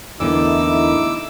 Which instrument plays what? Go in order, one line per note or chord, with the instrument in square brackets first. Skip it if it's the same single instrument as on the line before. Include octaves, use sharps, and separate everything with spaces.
[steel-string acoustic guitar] E2 D3 A#3 [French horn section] A3 D#4 E4 [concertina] D6 E6